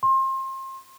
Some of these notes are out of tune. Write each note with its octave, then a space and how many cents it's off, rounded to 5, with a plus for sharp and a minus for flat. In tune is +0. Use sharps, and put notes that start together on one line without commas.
C6 +30